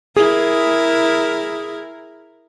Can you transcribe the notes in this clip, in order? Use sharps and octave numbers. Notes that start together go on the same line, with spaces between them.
E4 G#4 A#4